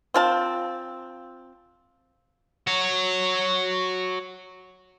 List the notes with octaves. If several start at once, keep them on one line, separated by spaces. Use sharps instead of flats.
C4 F4 A5
F#4 C#5